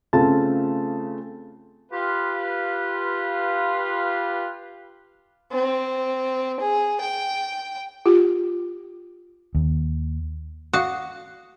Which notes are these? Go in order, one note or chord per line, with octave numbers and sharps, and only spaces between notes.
C#3 A3 C4 F4 A5 A6
F4 G4 B4
C4
G#4
G5
F4 G4
D#2
F#4 F5 D6 D#6